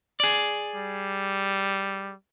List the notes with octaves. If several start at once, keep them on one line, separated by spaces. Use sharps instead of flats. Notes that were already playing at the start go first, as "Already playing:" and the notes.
G#4 D5
G3